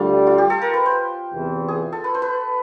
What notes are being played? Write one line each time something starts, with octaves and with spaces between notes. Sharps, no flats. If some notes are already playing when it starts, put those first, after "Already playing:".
Already playing: D2 D3 G3 F4
F4
G4
A4
A#4
B4
C5
E2 C3 E3
G#4
A4
B4
C5
B4